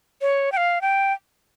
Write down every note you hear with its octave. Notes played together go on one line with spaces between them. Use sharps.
C#5
G5
F5
G5